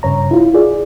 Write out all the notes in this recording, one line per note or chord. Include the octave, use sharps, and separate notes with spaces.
G2 C#3 C#5 A#5
E4 F4
F4 G#4 D5